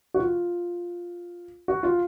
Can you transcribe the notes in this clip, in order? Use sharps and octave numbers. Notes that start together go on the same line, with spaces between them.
F#4
F4
F#4
F4